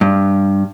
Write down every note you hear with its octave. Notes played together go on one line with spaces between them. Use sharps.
G2